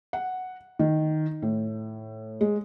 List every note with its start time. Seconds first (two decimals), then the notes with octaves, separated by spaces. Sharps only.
0.13 F#5
0.79 D#3
1.42 A2
2.41 G#3